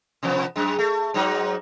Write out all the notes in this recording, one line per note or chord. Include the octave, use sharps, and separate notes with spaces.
C3 F3 B3
F#2 G#3
A3
G#2 F#3 D#4